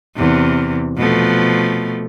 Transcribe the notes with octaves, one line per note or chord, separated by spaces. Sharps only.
E2 C3
B2 F3 A3